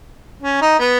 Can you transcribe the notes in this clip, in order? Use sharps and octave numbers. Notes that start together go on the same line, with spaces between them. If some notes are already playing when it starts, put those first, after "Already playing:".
C#4
D#4
B3